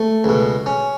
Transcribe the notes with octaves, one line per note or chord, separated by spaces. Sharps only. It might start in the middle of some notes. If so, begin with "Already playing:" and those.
Already playing: A3
C#2 B2
C#4